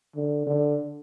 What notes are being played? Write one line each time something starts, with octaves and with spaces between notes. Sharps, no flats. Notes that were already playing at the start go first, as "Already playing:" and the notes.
D3
D3